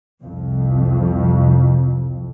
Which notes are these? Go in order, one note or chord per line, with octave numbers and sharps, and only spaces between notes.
C2 F2